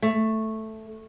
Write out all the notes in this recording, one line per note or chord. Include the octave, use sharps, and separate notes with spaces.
A3